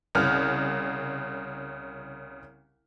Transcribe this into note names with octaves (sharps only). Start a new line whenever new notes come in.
C2 C#3 F6